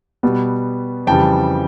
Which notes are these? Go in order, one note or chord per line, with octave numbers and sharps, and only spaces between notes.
B2 G3 B3
F2 C#3 E3 G3 G5 A5